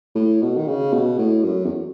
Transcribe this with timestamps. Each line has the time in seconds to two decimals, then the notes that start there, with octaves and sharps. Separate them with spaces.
0.15 A2
0.42 B2
0.57 D#3
0.68 C#3
0.93 B2
1.18 A2
1.44 F#2
1.65 E2